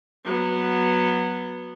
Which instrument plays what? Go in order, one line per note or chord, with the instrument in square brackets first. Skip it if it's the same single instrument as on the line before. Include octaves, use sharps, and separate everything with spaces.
[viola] F#3 B3